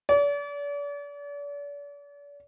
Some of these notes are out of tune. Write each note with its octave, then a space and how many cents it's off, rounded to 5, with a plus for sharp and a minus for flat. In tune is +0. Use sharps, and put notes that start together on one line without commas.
D5 -40